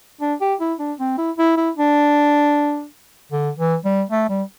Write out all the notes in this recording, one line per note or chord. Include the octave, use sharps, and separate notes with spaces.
D4
G4
E4
D4
C4
E4
E4
E4
D4
D3
E3
G3
A3
G3